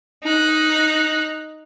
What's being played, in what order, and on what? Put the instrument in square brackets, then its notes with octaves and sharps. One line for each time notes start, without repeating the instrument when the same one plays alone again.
[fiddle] D#4 F#6